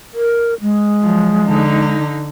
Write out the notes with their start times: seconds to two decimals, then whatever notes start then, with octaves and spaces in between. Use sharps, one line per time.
0.14 A#4
0.61 G#3
1.02 F3 F#3
1.45 D3 D#4